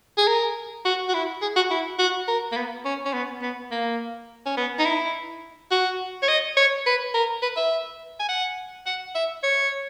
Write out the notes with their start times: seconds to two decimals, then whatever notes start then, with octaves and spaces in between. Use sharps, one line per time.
0.17 G#4
0.28 A#4
0.85 F#4
1.09 F#4
1.14 E4
1.42 G#4
1.56 F#4
1.71 E4
1.99 F#4
2.28 A#4
2.52 A#3
2.56 B3
2.85 C#4
3.05 C#4
3.13 B3
3.42 B3
3.71 A#3
4.46 C#4
4.57 B3
4.79 D#4
4.85 E4
5.71 F#4
6.23 C#5
6.28 D#5
6.57 C#5
6.86 B4
7.14 A#4
7.42 B4
7.57 E5
8.20 G#5
8.29 F#5
8.86 F#5
9.15 E5
9.43 C#5